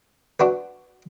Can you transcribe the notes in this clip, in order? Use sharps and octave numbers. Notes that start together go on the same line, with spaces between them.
D4 F#4 B4